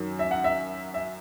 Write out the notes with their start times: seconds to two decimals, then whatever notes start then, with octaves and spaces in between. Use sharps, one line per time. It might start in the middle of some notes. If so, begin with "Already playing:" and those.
Already playing: F#2 D#3 F#3
0.19 E5
0.31 F#5
0.44 E5
0.94 E5